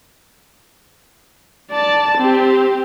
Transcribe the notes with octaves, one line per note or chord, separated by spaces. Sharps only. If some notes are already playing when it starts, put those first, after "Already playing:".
D5 A5
C4 G4